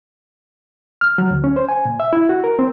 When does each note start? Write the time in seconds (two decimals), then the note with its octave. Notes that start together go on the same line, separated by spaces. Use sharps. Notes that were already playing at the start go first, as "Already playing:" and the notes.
1.01 F6
1.18 F#3
1.31 D2
1.44 C#4
1.56 C5
1.69 G#5
1.85 A#2
2.00 E5
2.13 E4
2.29 F#4
2.44 A#4
2.59 C4